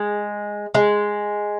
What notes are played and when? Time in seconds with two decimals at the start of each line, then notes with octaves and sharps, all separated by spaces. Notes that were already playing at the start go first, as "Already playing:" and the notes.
Already playing: G#3
0.75 G#3